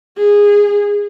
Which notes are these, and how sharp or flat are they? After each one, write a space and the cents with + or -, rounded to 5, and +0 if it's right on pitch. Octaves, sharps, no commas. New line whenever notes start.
G#4 -15